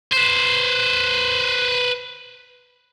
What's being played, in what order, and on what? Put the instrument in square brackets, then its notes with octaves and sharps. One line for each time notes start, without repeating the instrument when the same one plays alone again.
[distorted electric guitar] B4 C5